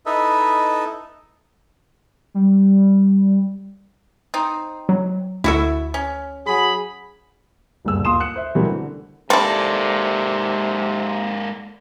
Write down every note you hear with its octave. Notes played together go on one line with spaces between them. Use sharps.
D#4 E4 A4 B4 D#5 E5
G3
C4 D#4
F#3
D2 E4 F#4 A4 E5
C#4
F#3 G#4 B5
F#1 D2 G2 A#2 G#4 E6
D#2 F4 C6 D#6 E7
D#6 F#6 C#7
C5 E5
B2 E3 G3 A3 C4 A#4
D3
G#2 C3 A#3 C4 E4 A4 D5